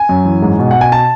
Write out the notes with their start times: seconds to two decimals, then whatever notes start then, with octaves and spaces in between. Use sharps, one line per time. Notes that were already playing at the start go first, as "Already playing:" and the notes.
Already playing: G#5
0.09 F#2
0.25 E3
0.42 G#2
0.59 B2
0.71 B2 F#5
0.81 G#5
0.92 A5